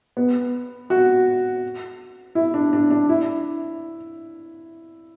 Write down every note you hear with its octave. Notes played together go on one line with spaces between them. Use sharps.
B3
F#4
E4
D4
D4
D4
E4